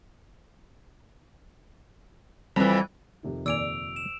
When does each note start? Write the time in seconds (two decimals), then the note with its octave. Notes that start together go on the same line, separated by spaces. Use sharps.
2.56 F2 E3 G3
3.23 F2 C3 D#3
3.46 D#2 A#2 D5 G#5 E6 D7 F7
3.96 E7